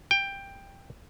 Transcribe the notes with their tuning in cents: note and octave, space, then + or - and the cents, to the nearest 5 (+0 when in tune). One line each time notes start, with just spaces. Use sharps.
G5 +15